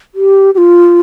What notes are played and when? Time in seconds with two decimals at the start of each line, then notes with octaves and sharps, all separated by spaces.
0.15 G4
0.55 G4
0.58 F4